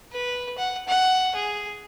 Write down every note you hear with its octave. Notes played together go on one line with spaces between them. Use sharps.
B4
F#5
F#5
G#4